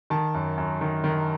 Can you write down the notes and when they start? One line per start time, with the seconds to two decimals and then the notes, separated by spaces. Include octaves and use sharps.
0.10 D#3 A5
0.34 F#2
0.58 F#2
0.81 D#3
1.04 D#3